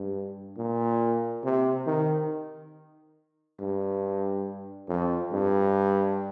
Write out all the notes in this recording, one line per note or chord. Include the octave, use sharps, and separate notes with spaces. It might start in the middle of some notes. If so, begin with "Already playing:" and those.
Already playing: G2
A#2
C3
D#3
G2
F2
G2